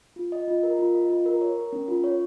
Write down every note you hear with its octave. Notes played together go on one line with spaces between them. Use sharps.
F4
D#5
F4
A#4
F4
D#5
F4
A#4
C#5
A#4
C#4
F4
C#5